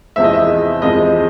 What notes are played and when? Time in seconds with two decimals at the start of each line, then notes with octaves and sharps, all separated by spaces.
0.16 E2 C3 F3 G#3 C4 E5
0.24 D#5
0.33 E5
0.82 E2 C3 F3 G#3 C4 D#5